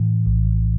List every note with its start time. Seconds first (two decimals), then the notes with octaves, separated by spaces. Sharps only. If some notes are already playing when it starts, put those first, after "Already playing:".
Already playing: A2 E3
0.26 A#1